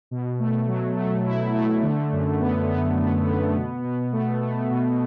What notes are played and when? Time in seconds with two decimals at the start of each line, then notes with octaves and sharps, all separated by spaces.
0.11 B2
0.39 A3
0.67 F#3
0.96 A3
1.26 E4
1.54 A3
1.83 D3
2.12 F#2
2.40 B3
2.69 B3
2.98 B3
3.27 B3
3.55 B2
3.84 B2
4.12 A3
4.41 A3
4.71 B2